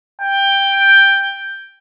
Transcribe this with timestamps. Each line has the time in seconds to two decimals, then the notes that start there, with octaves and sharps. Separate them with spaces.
0.22 G5